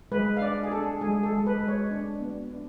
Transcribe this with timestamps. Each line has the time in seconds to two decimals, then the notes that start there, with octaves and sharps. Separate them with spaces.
0.12 G#3 B4
0.37 F5
0.41 D4 D5
0.63 G#4
0.71 D4 A4
1.01 G#3 G#4
1.23 A4
1.31 G#3
1.46 B4
1.60 G#3
1.68 C#5
1.91 D4
2.20 B3
2.50 D4